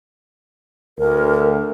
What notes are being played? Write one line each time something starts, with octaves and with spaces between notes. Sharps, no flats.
D2 A#4